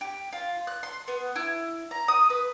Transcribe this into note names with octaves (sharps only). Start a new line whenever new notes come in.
G4
F4
F#6
C6
B3
E4
A#5
D#6
B4